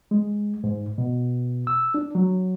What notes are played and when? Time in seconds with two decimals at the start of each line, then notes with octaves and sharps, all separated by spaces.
0.11 G#3
0.64 G#2
0.98 B2
1.67 E6
1.94 D4
2.15 F#3